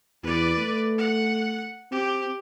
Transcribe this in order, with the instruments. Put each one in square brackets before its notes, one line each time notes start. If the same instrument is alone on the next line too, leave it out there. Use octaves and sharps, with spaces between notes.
[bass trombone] E2 [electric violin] B4 D5
[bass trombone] A3
[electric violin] F#5
[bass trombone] C4 [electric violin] G4